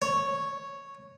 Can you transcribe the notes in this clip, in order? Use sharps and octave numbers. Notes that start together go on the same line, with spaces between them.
C#5